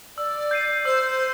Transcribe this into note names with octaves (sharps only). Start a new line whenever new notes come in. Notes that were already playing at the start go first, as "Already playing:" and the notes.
D5 E6
G6 C7 D#7
C5 E6